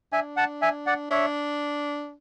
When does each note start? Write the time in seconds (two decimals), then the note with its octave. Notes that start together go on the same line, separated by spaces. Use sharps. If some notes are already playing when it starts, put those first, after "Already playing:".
0.12 D4 E5 G#5
0.37 F#5 A5
0.62 E5 G#5
0.86 D5 F#5
1.11 D4 C#5 E5